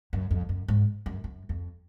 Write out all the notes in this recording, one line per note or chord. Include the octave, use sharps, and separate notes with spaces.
F#2
F2
F#2
G#2
F#2
F#2
F2